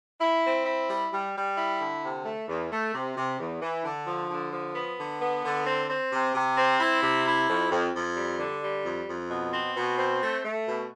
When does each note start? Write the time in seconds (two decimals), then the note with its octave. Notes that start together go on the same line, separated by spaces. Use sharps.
0.21 E4
0.44 C4
0.66 E4
0.90 G3
1.11 G3
1.34 G3
1.58 E4
1.81 D3
2.02 C3
2.25 A3
2.48 E2
2.71 A3
2.94 C3
3.17 C3
3.39 E2
3.61 E3
3.84 D3
4.07 F3
4.29 D3
4.53 F3
4.75 B3
4.98 D3
5.21 B3
5.44 D3
5.67 C4
5.90 C4
6.12 C3
6.35 C3
6.57 C4
6.80 E4
7.03 C3
7.25 E4
7.49 F2
7.71 F2
7.94 F2
8.17 G3
8.39 D3
8.62 G3
8.85 F2
9.08 F2
9.30 B2
9.53 C4
9.76 B2
9.98 C4
10.21 A3
10.44 A3
10.67 B2